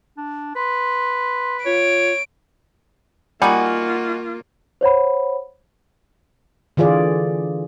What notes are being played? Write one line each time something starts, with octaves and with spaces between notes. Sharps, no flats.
D4
B4 C6
F4 C#5 D7
G3 A#3 D#4 F4 F#4 F#5 G#5
C5 C#5 F#5 B5
D3 E3 F4 G#4 D5